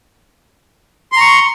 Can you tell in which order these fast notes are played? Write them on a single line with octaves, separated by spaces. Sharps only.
C6 A#5 C#6